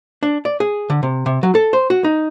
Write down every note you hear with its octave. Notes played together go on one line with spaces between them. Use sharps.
D4
D5
G#4
D3
C3
C3
F#3
A4
C5
F#4
D#4